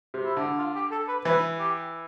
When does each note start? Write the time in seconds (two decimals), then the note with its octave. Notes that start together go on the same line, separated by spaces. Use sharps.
0.14 C3
0.25 E4
0.37 D3
0.58 F4
0.75 G4
0.92 A4
1.08 B4
1.25 E3 B4
1.59 G4